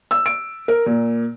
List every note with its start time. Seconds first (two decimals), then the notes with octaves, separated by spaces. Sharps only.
0.11 E6
0.26 D7
0.68 A#4
0.86 A#2